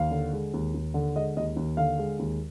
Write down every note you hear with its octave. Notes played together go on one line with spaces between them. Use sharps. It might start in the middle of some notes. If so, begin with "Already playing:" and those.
Already playing: D#2 F5
D3
G#3
D#2
D#2
D3
G#3 D#5
D#2 D#5
D#2
D3 F5
G#3
D#2